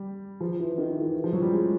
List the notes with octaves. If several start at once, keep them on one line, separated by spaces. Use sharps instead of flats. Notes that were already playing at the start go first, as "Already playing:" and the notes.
Already playing: G3
F3
E3
D#3
E3
E3
E3
F3
F#3
G3
G#3